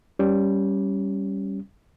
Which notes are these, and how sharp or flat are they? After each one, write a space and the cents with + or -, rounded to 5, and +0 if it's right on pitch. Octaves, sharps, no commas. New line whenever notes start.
G3 +0 C#4 +0